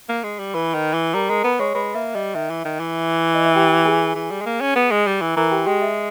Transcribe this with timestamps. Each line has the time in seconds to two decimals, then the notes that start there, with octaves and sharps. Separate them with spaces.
0.09 A#3
0.24 G#3
0.39 G3
0.54 E3 B4 B5
0.74 D#3
0.94 E3
1.14 G3 A#4 A#5
1.29 G#3 A#4 A#5
1.44 B3 B4 B5
1.59 G#3 C#5 C#6
1.75 G#3 B4 B5
1.94 A#3 E5
2.15 G3 D#5
2.35 D#3 E5
2.50 E3
2.65 D#3
2.80 E3
3.34 D#5
3.45 E5
3.55 G4 G5
3.85 G#4 G#5
4.15 E3
4.31 G3
4.41 G#3
4.46 A#3
4.61 C#4
4.76 B3
4.91 G#3
5.07 G3
5.21 E3
5.36 E3 A#4 A#5
5.51 G4 G5
5.66 G#3 G4 G5
5.82 E5